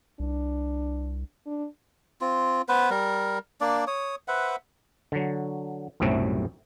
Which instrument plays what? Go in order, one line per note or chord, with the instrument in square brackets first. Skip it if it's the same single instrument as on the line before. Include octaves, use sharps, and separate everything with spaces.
[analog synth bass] C2 [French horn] D4
[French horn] D4
[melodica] C4 F4
B3 B4 C5
G3 A#4
A#3 D4 D5
C#5 D#6
B4 C5 E5 F#5
[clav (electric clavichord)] D3 F#3
B1 F#2 A2 C3 G3 A3